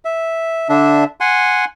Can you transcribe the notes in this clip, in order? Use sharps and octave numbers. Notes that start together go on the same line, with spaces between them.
E5
D3 D4 E5
F#5 G#5 C6